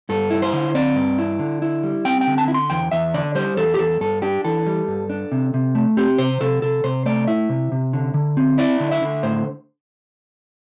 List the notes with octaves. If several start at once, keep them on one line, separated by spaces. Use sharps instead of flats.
G2 A4
E4
C5
D3
C4 D5
G2
E4
D3
E4
G3
C4 G5
G5
D3
A5
E4
C6
E2 G5
E2 E5
D3 D5
G3 C5
E2 A4
G4
E2 A4
G2 A4
D4 G4
E3 A4
G3
G2
D4
C3
C3
A3
C4 G4
C3 C5
C3 A4
C3 A4
C3 C5
A3 D5
E4 E5
C3
C3
D3
D3
C4
E4 D5
D3
E5
D3
A2 C5